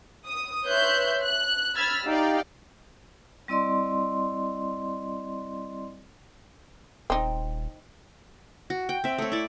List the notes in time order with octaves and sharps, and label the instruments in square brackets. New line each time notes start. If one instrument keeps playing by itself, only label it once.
[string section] D#6
B4 C#5 E5 C6 F#6 G6
F#6
B5 E6 F6 G#6 A6
D#4 G4 D5 F5 G5
[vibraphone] G3 C4 E4 D5 D#5 C6
[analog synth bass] D#1 [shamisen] C4 D#4
[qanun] F#4
G5
C4 E5
A3 C#5
E4 D5